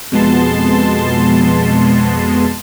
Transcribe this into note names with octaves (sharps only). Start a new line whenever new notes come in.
F2 B2 G#3 B3 A5 C6